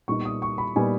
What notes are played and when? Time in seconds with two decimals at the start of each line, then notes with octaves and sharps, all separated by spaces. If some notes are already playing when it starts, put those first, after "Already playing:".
0.08 A#2 G3 B3 D#4 C#6
0.25 D#6
0.42 C#6
0.58 B5
0.76 A#2 G3 B3 D#4 G#5